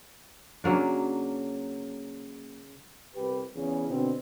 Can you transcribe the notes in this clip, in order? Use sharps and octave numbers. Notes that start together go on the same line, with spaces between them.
C#3 F#3 A#3 D4
C2 G4 B4
E2 C#3
B2 D3 C4